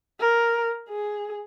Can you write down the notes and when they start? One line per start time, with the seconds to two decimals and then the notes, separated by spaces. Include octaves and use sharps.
0.20 A#4
0.89 G#4